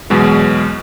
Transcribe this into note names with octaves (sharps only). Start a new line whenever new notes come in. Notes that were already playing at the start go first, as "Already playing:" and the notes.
E2 B2 F#3 G#3